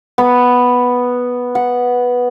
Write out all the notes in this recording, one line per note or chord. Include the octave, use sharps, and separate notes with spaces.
B3
F#5